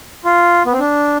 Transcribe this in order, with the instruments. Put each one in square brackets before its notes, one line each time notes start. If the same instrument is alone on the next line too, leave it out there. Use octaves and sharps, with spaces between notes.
[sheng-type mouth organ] F4
B3
C4
D4